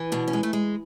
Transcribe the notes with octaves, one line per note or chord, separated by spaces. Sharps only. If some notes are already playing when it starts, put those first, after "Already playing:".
Already playing: E3
B2 D4
C#4
G#3
A3
G#3